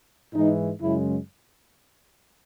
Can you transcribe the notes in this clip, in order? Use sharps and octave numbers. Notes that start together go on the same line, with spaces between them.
G#2 E3 G#3 D#4
F#2 C#3 G#3 E4